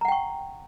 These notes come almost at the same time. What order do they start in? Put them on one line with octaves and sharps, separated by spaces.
A#5 F#5 G5 C#6